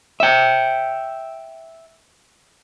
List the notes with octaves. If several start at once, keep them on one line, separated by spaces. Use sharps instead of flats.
E5 G5